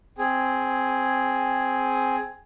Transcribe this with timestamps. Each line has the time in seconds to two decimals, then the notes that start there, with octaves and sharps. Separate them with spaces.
0.18 C4 G#4